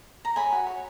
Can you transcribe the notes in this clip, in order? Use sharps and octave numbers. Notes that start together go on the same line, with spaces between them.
A#5
C#5 G#5 B5
F#4
C#5